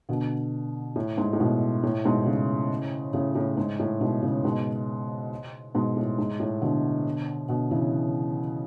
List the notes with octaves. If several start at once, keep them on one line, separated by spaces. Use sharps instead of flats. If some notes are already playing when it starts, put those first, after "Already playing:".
B2 D3
A2
G#2
A2
G#2 B2
A2
G#2 B2
A2 C#3
A2 C#3
A2
G#2
A2
G#2 B2
A2 C#3
G#2 B2
G#2 B2
A2
G#2
A2
B2 D3
B2 D3
C#3 E3